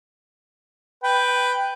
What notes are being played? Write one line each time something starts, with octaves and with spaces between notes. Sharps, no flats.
B4 G5